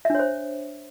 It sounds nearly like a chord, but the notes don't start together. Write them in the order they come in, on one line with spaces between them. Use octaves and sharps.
E5 D4 C#5 C5